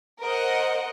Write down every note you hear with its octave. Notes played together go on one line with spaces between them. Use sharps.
A#4 C5 D#5 F#5